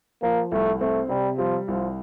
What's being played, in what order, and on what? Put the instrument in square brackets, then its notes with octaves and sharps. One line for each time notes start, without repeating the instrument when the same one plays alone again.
[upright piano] F3 [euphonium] A#3
[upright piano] C2 [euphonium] A3
[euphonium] A3 [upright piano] C4
[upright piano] C3 [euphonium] G3
[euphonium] F3 [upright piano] G3
[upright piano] C2 [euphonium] F3